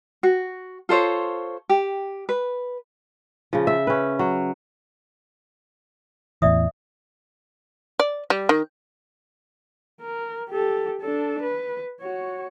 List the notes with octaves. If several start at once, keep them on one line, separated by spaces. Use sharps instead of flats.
F#4
F4 A4 C5 C#5
G4
B4
C#3 F3
E5
C#4 B4
F#3
E2 A2 E3 D5 E5 D#6
D5
G3
D#3
A#4
G4 A4
D4 A4
B4
F#4 C#5